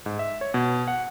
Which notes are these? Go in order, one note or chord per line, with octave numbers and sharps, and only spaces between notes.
G#2
E5
C#5
B2
F#5